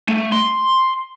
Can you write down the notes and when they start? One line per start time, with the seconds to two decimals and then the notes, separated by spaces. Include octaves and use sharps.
0.08 A3
0.32 C6